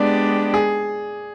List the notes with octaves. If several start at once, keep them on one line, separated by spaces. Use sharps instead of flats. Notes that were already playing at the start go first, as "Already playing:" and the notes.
Already playing: G#3 B3 D4 G4 D5
G#4